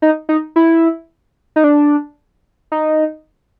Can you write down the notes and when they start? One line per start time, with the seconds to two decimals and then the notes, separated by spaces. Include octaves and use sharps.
0.02 D#4
0.29 D#4
0.56 E4
1.56 D#4
1.64 D4
2.72 D#4